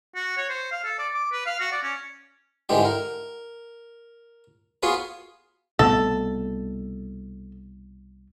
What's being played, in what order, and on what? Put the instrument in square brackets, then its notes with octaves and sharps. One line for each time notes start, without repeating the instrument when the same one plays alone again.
[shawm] F#4
C#5
C5
F5
A4
D5
D6
B4
F5
F#4
D5
C#4
[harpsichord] G#2 D3 E3 G3 G#3 G4
A#4
B3 F4 F#4 G#4 B4
[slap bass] C2 B2 A3 [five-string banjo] A4